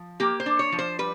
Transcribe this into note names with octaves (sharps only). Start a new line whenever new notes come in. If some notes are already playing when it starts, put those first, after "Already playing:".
Already playing: F3
A#3 G4
C5
D4
C#5
F3
C5
G3 B4